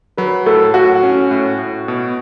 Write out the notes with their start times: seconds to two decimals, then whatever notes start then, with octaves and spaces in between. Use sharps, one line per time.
0.17 F#3 B4
0.46 A2 A4
0.74 A2 F#4
1.03 C#4
1.31 A2
1.59 A2
1.88 B2